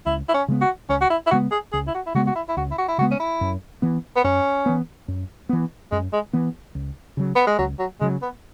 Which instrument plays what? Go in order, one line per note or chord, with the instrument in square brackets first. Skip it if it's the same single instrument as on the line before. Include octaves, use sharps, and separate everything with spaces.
[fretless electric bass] C#2 [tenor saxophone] E4
[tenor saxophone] E4
C#4
[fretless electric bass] C#3 G#3 B3
[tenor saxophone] F#4
[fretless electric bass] C#2 [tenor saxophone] C#4
[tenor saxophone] F#4
E4
E4
[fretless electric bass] C#3 G#3 B3 [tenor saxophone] F#4
[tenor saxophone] G#4
[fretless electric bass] C#2 [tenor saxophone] G#4
[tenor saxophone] E4
F#4
E4
[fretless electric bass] C#3 G#3 B3 [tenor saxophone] F#4
[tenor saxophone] F#4
E4
E4
[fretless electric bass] C#2 [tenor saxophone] F#4
[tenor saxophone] E4
F#4
E4
[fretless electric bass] C#3 G#3 B3 [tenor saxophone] F#4
[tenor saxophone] C#4
E4
[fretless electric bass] F#2
E3 B3
[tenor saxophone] B3
[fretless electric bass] F#2 [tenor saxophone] C#4
[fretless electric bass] E3 B3
F#2
E3 B3
[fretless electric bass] F#2 [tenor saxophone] G#3
[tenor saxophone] G#3
[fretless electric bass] E3 B3
C#2
C#3 F#3
[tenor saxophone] B3
G#3
[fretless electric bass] C#2 [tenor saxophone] F#3
[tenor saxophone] F#3
[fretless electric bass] C#3 F#3 [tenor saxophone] G#3
[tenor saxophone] B3